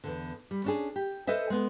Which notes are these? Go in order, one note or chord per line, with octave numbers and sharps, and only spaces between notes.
E2 G2 D3
G3
C#4 D4 G#4
G4
A4 B4 C5 D#5 E5
G#3 B3